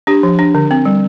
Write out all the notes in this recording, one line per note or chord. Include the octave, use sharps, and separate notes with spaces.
D4 G4
F3
D4
D3
C4
G3